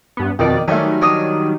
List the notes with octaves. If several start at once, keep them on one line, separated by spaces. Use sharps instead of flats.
G2 B3
F2 B2 D#3 D5
D#3 F#3 G3 A3 C#4
D4 C#5 D#5